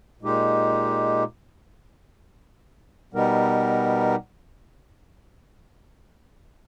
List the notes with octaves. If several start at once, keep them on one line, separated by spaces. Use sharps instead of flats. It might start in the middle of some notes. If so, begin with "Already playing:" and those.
A#2 G#3 D#4 G4
B2 G3 B3 D#4 A#4